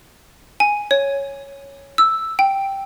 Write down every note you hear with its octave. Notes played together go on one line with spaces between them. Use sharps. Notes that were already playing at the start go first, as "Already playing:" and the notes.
G#5
C#5
E6
G5